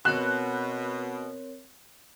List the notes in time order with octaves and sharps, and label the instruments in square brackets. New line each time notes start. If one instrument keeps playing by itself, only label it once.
[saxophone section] B2 [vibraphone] C4 A#4 C#5 [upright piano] F#6